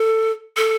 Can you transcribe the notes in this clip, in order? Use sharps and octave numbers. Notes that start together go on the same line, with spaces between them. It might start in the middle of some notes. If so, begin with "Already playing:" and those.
Already playing: A4
A4